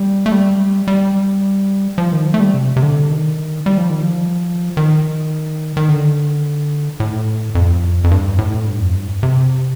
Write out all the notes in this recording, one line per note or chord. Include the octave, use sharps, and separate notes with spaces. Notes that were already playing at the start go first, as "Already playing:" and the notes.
Already playing: G3
A3
G3
G3
F3
D#3
F3
A3
G3
C3
C3
D3
D#3
G3
F3
D#3
F3
D#3
D#3
D3
A2
F2
F2
G2
A2
G2
F2
G2
C3